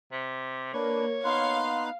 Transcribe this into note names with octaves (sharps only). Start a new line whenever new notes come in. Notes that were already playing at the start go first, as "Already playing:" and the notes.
C3
A#3 D4 B4 C#5
B3 D#4 F5 C6 F#6